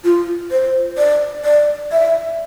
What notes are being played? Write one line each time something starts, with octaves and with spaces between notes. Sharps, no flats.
F4
C5
D5
D5
E5